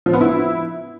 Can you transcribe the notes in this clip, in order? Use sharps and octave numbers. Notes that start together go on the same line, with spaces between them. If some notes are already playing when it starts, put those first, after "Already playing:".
F3
B3
E4